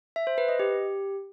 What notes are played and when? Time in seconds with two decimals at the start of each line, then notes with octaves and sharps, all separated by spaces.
0.16 E5
0.27 C5
0.38 B4
0.49 D#5
0.59 G4